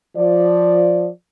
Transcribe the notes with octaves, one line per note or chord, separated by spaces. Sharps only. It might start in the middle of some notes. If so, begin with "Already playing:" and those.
F3 D5